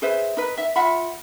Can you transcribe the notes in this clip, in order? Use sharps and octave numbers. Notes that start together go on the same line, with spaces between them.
G#4 B4 C5 E5
D#4 B4
E5
F4 E5 F#5 B5